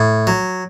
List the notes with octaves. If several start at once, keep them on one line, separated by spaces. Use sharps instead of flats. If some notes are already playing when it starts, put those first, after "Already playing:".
Already playing: A2
F#3